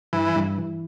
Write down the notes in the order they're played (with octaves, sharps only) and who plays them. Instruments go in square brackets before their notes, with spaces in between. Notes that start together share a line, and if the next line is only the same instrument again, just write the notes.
[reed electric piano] G2 [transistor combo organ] E3
[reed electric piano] G2
E3